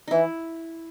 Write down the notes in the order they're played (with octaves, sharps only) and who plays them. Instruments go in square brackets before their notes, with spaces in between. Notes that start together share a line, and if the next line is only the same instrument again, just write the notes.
[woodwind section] E3 [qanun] D#4 E4